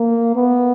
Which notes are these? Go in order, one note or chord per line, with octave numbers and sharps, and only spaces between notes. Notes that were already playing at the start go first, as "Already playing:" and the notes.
Already playing: A#3
B3